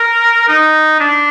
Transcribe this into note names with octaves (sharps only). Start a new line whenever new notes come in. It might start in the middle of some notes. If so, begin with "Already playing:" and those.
Already playing: A#4
D#4
D4